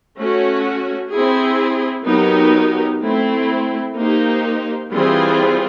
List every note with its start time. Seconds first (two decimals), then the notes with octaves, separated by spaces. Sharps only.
0.17 A3 C#4 F#4
1.11 C4 E4 G#4
2.06 F#3 B3 D#4 G4 A#4
3.01 A3 C4 E4
3.96 A#3 D#4 G4 C5
4.91 E3 G3 C4 F4 G#4